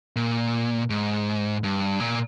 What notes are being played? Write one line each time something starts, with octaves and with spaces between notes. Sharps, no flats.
A#2
G#2
G2
A#2